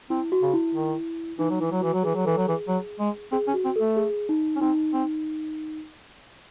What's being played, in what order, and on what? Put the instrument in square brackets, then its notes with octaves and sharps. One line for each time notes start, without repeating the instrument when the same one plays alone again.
[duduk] C4 [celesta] E4
[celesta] F#4
[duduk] C#3
[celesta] E4
[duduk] D#3
[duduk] E3 [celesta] D#4
[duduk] F#3
[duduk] E3 [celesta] E4
[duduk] F#3
[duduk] E3 [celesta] F#4
[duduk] F#3
[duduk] E3 [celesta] G#4
[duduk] F#3
[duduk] E3 [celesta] A4
[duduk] F#3
[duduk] E3 [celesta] G#4
[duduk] F#3
G#3
[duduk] C4 [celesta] G#4
[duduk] C#4
[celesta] F#4
[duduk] C4
[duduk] A3 [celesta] A4
[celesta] G#4
D#4
[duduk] C#4
[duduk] C4 [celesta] D#4
[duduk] C4